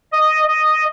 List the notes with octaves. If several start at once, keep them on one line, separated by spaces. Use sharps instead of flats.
D#5
D#5